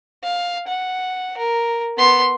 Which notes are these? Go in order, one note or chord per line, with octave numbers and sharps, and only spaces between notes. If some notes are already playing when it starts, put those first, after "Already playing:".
F5
F#5
A#4
B3 C6